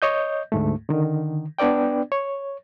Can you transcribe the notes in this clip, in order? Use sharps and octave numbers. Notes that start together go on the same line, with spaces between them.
C#5 D#5 G6
D2 G#2 A3
D3 D#3
B3 D4 B4 D5 G5
C#5